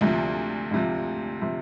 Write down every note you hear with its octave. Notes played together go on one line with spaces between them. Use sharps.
D2 C3 F3
D2 C3 F3
C3 F3